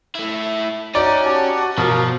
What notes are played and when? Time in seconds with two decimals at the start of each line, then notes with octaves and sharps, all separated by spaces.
0.15 A3 E4
0.95 C#4 D#4 F#4 D5
1.25 G4 A5
1.78 B2 F3 A#4 F5